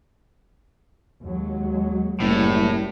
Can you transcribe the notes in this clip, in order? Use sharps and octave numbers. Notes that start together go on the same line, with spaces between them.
D#2 F#3 G#3
F#1 A2 G3